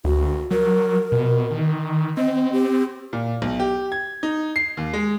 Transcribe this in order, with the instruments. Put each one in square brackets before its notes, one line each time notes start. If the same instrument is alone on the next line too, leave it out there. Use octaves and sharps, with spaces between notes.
[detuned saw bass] D2 [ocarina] F#4
[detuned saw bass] F#3 [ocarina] A#4
[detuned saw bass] B2
D#3
[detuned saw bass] C4 [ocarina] D#5
[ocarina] G4
[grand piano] A#2
B1
G4
G#6
D#4
C7
D#2
G#3